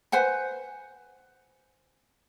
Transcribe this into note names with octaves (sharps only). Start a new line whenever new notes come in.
B4 C5 F#5 G#5